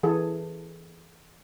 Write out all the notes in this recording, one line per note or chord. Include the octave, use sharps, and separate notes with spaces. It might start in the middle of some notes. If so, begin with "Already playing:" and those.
E3 G#4 A4